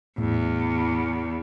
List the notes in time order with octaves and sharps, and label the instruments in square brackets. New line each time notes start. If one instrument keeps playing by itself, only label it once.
[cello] E2 [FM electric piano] A2